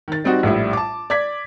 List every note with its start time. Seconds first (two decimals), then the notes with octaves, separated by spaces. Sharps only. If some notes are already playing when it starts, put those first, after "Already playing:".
0.08 D#3 A6
0.24 G3 C4 D#4 F#4
0.43 A#1 A2 G3 E4
0.73 A5 D6
1.10 D5 D6 G#6 B6